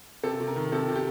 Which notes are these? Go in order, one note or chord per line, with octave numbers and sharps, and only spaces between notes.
C3 A4
C3
A#4
D#3
C3 A4
C3
G4